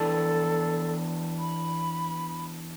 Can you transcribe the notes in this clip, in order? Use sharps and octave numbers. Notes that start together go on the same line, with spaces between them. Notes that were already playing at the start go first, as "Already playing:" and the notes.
Already playing: E2 E3 B3 D4 A4
B5